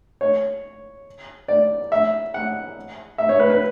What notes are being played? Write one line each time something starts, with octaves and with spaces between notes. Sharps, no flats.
C#5
D5
E5
F#5
E5
C#5
B4
B4